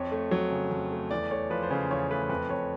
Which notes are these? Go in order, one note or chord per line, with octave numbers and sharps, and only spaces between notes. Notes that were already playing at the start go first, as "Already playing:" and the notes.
Already playing: F2 C#5
A3
F#3
C#3
F2
A3
E2 D5
A3 C#5
F3 B4
C5
C#3 C#5
E2 C#5
A3 B4
F2 B4
F2 C#5